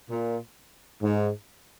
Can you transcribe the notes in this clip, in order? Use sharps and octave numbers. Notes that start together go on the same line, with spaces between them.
A#2
G#2